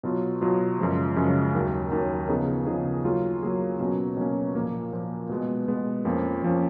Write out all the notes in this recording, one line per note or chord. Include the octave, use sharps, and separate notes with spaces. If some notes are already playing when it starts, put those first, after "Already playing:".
B2 F#3 B3 F4
B2 F#3 B3 F4
F#2 C#3 F3 G#3
F#2 C#3 F3 G#3
D#2 D#3 F#3
D#2 D#3 F#3
C#3 F3 B3 D#4 G#4
C#3 F3 B3 D#4 G#4
F#3 A#3 F4 G#4
F#3 A#3 F4 G#4
B2 F#3 A#3 C#4
B2 F#3 A#3 C#4
A#2 F3 A#3
A#2 F3 A#3
B2 G#3 B3
B2 G#3 B3
F2 F3 A#3 C#4
F2 F3 A#3 C#4